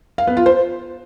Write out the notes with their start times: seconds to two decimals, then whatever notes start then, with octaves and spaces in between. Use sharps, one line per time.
0.18 F5
0.27 B3
0.37 F4
0.46 C5